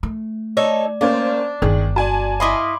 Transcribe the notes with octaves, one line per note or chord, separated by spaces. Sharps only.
A3
D#4 A4 C#5 D5
A#3 C#4 D4 C5
G1 D#3 G#4
F#4 D5 G#5 A5
E4 D#5 F5 B5 C6 D6